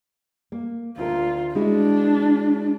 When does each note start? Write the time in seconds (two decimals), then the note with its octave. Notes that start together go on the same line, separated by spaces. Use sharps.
0.52 A#3
0.98 D2 F4 A#4
1.55 G#3 D4 E4 F#4